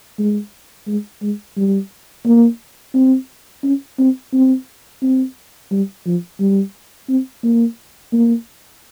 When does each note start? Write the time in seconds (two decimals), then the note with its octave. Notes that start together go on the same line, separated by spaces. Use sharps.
0.18 G#3
0.87 G#3
1.22 G#3
1.57 G3
2.26 A#3
2.94 C4
3.63 C#4
3.99 C4
4.33 C4
5.02 C4
5.71 G3
6.06 F3
6.40 G3
7.09 C4
7.44 A#3
8.13 A#3